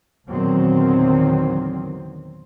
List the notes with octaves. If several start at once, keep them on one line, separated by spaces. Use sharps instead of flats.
E2 A#2 D3 D#3 F#3 C4